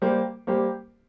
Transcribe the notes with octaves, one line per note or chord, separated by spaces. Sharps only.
G3 A#3 G4 C5
G3 A#3 G4 C5